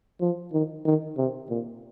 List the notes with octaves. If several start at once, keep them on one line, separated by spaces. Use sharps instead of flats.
F3
D#3
D#3
C3
A#2